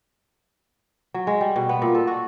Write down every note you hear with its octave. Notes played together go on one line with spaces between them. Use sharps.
F#3
G#3
G3
B2
B3
A#2
A4
F#4